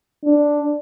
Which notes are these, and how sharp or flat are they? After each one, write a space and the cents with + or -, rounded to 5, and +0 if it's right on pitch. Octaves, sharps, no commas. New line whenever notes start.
D4 +0